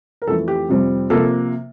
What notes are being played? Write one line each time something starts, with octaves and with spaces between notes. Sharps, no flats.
A#4
F2 E3 A3 A4
G4
F2 C3 G3 C4
C3 F3 A#3 A4